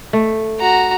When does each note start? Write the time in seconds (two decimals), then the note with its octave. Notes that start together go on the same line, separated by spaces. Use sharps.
0.13 A3
0.60 F#4 A#5